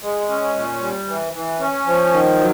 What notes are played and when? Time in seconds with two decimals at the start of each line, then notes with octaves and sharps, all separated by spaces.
0.02 G#3
0.29 C#4
0.55 A#2
0.81 G3
1.07 E3
1.33 E3
1.60 C#4
1.86 F3
2.11 D#3
2.38 F#3